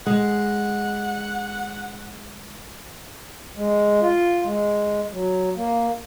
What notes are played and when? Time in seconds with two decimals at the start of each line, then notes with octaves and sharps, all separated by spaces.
0.06 G#3 F#5
3.56 G#3
4.01 F4
4.43 G#3
5.12 F#3
5.56 A#3